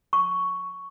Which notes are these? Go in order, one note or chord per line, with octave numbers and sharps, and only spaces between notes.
C#6